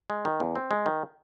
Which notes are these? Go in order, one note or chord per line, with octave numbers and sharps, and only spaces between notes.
G#3
D#3
E2
C4
G#3
D#3